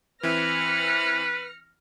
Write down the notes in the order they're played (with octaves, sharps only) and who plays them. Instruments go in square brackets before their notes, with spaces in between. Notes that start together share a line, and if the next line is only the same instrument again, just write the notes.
[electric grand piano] E3 C4 E4 [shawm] B4 [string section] F6 A#6 C#7